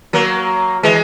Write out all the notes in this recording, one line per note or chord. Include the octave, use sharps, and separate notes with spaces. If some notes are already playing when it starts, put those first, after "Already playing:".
F#3 A#3
E3 G#3